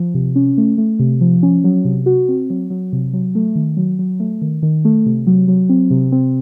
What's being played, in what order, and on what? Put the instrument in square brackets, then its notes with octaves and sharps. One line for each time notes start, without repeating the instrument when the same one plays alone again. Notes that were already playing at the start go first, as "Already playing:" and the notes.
Already playing: [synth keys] F3
C3
C#4
A3
A3
C3
F3
C#4
F#3
C3
F#4
C4
F#3
F#3
C3
F#3
A3
D#3
F#3
F#3
A3
D#3
D#3
A3
C3
F#3
F#3
C4
C3
C4